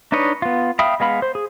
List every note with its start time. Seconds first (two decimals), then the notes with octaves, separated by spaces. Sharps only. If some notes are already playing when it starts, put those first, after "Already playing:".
0.12 D4 D#4 B4 C#5 D#5
0.42 B3 F4
0.79 E5 F5 G5 B5 D#6
1.00 G#3 B3 F5 B5
1.22 C5
1.35 G#4